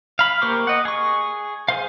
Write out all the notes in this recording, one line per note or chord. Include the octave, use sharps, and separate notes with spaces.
F5 B5
A#3 G4 C5 C#6 D6
D#5 F#5
G#4 C#6
G#4 C5 F5